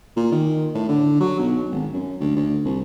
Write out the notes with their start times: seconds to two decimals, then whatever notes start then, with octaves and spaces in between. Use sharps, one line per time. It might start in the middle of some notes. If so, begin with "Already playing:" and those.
0.17 A#2
0.32 D#3
0.74 A2
0.89 D3
1.20 F#3
1.39 B1
1.71 G#1
1.94 F#2
2.20 D2
2.36 D2
2.65 C2